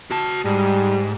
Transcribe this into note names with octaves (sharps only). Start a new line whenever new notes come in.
F#4 A5
G#2 G3